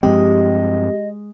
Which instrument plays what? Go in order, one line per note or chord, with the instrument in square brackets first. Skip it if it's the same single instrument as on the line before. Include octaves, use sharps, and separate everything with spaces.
[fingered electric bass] G2 F3 C4 [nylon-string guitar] G#3 [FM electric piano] G4 [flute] D#5